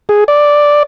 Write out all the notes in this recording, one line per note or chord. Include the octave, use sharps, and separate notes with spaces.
G#4
D5